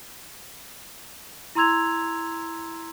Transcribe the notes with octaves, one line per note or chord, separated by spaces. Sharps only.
E4 A#5 C6 E6 G#6 F7